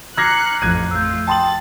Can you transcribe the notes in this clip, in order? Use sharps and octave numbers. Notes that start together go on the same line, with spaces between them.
A#5 D6 F6 F#6 G#6 A#6 C7 C#7
A1 F2 A2 F#6 G#6 D#7
A3 F4 E6 G6
G5 A5 C6 D#6 A6 F#7